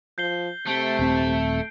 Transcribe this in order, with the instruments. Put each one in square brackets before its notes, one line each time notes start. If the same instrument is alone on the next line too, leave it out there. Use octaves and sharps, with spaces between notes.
[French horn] F3 [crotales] G6 C7 G7
[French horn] C3 [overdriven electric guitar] A3 [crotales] G6 D7 G7
[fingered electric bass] D#1 C4